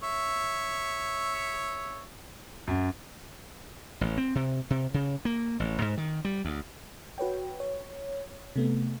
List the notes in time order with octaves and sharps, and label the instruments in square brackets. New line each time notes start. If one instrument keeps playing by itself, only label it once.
[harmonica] C#5 E5
[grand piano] F#2
[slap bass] A1
C4
C3
C3
C#3
A#3
A1
G#2
D#3
G3
D2
[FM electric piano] F#4 B4 C#5 G5
C#5
C3 A3 B3